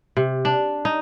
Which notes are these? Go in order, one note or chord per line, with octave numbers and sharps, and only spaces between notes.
C3
D4
D#4